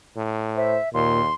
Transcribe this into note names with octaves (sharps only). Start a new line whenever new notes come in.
A2
C5 E5
D#2 A#2 C6